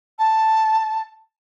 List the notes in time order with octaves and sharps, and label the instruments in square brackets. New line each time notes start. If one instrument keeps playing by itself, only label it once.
[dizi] A5